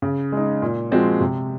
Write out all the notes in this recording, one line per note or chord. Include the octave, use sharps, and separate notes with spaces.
C#3
G#3 D#4
A#2
F3 G#3 C4 F#4
C3